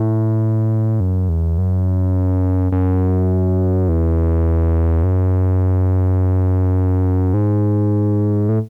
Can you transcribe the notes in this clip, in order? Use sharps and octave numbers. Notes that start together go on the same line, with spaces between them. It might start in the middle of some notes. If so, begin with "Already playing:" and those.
Already playing: A2
F#2
E2
F#2
F#2
E2
F#2
G#2
A2